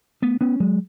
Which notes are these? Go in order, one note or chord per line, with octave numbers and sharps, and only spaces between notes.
A3 B3
B3 C#4
F#3 G#3